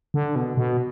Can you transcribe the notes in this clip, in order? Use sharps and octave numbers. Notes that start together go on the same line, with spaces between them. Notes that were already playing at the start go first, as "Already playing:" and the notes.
D3
B2
B2